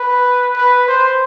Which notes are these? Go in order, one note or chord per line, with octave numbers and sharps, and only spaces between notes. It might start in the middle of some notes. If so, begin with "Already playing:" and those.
Already playing: B4
B4
C5